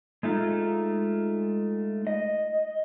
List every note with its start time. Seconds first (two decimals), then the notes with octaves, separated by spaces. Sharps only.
0.23 G#3 A3 D#4 F4
2.07 D#5